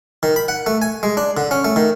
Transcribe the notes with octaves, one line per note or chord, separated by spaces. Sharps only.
D#3
B5
F#5
A3
G#5
G#3
D4
D3
C#4
A3
D#3